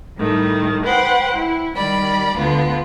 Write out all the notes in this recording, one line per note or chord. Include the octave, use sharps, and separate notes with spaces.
A2 D#3 G3 A3
B4 C5 F#5 G5
E4
D#3 G3 D5 B5
D2 D3 B3 F4